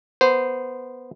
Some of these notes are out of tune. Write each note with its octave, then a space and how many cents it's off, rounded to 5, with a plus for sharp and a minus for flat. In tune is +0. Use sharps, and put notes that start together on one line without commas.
B3 -10 C5 -15